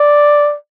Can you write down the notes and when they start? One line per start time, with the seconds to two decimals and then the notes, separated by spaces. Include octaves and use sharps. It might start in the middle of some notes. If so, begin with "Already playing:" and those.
Already playing: D5